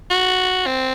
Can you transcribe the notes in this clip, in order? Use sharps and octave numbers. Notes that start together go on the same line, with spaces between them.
F#4
C4